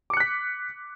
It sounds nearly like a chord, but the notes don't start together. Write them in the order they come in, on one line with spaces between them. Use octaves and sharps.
D6 C#7 F#6 B6